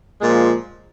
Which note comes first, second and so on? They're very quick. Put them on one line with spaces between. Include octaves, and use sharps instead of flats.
G#3 A#2 F3